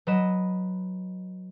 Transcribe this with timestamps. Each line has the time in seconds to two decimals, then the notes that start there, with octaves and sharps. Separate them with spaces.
0.07 F#3 B4 D#5 E7